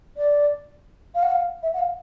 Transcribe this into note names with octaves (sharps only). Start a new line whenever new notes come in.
D5
F5
F#5
F5
E5
F#5
F5